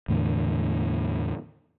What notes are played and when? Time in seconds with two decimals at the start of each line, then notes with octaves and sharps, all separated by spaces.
0.08 E2 A2 D3